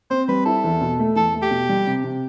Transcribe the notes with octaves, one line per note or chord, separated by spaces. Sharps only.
C4 C5
G3 B4
E4 A4
E2
B2
A3
E2 A4
A3
G4
B2
G3
C3
C3